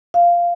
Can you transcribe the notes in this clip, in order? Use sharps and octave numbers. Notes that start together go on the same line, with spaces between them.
F5